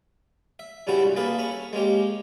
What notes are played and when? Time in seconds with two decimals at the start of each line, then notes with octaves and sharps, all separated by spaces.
0.59 E5
0.87 G2 C#3 G3 C#4 E4 F#4
1.03 C2
1.16 A#3 G#4 A4 B4 E5 F5
1.39 C#4 B5 C#6
1.73 G#3 A#3 C#4 G4